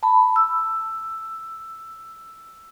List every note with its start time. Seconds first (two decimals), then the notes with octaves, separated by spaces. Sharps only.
0.03 A5 B5
0.36 E6